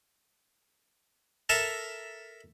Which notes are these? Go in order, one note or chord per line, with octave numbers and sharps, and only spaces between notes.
A4 A#4 E5 A5